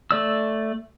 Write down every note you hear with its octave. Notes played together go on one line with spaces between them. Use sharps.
A3 D5 E6